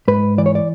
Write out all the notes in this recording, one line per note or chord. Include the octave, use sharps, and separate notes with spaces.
G#2 B4
E3 D5
C#5
D5